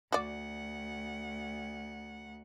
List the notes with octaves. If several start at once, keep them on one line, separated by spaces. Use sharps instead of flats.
D2 F#4 D5 F#5